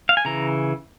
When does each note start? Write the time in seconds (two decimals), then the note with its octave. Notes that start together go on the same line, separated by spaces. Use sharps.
0.09 F5
0.17 G#5
0.25 C#3 E3 A#5